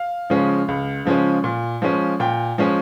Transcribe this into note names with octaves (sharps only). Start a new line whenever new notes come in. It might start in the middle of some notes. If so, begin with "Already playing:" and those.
Already playing: F5
C#3 F3 G#3 C#4
C#2
C#3 F3 G#3 C#4
A#2
F3 G#3 C#4
A#2 G5
F3 G#3 C#4